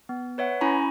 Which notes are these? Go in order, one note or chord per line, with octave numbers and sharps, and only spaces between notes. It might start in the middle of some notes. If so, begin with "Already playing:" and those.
B3
B4 C#5 E5 F#5
C#4 E4 G#5 A#5 B5 C#6